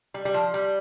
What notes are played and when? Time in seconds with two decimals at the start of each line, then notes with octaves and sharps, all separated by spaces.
0.14 G3
0.25 G3
0.34 F3
0.54 G3